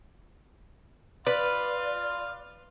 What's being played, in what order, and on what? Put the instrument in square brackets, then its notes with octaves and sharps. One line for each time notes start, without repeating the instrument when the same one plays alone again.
[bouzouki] B4 [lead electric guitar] D5 [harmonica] F5 C6